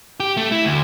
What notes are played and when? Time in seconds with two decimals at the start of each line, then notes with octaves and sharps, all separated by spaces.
0.20 G4
0.37 A3
0.52 E4
0.65 D2